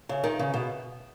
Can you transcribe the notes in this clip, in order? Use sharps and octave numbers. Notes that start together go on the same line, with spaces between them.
C#3
D#3
C#3
B2